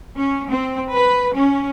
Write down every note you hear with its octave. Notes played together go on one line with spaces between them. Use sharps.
C#4
C4
B4
C#4